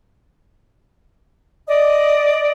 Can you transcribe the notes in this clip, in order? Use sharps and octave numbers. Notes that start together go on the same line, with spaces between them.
D5 D#5 D#6